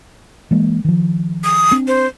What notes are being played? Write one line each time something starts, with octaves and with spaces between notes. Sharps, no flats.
E3 G#3 A#3
D#3 F3
D#6
C4 D4
C5